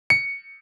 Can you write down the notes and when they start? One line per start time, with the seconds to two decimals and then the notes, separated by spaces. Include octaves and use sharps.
0.10 C#7